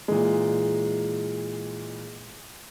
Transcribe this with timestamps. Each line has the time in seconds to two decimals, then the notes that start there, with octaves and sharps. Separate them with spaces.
0.08 A#2 E3 G#3